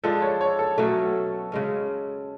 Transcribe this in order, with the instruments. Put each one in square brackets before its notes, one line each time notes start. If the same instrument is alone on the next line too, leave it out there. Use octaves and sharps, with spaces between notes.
[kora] F3 G#3 D4 [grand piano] A4
[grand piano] C#5
C#5
A4
[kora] B2 F#3 A3 C#4
C#3 G#3 C#4